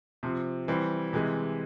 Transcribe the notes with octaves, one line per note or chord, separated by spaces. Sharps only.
C3 F3 C4
E3 G3 C4
C3 E3 G#3